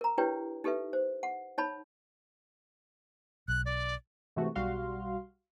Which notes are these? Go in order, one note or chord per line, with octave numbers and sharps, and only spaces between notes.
A#4 A#5
D4 E4 G4 B4 C#5 G5
D#4 G4 A4 B4 E5
C5
F#5
D#4 C#5 A5 B5
B1 F#6
D5
G#2 C3 E3 A3 F#4
B1 G3 F#4 F5 C6